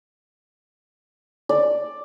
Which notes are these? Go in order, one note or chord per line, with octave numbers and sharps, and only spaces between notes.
D5